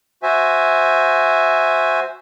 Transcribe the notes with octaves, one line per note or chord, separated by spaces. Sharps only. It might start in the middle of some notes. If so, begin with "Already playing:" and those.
F#4 C5 E5 G#5